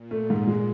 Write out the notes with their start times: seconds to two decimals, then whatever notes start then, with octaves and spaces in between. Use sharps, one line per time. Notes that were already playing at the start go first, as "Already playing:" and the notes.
Already playing: A#2
0.11 A3
0.30 G#2
0.47 G#3